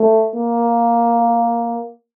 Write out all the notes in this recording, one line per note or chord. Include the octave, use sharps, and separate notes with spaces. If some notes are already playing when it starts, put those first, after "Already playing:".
Already playing: A3
A#3